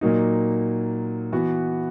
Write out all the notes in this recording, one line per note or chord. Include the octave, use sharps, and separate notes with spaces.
A#2 F#3 A#3 D#4
E3 B3 F#4